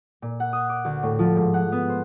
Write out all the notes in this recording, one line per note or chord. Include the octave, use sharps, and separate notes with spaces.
A#2
F#5
D#6
D6
D2
A2
F3
G#2
F#5
B3
C5